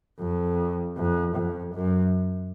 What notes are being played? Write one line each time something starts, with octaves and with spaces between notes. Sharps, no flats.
F2
F2
F2
F#2